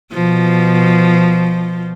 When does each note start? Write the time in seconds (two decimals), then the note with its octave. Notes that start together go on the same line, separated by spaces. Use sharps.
0.13 B2 F3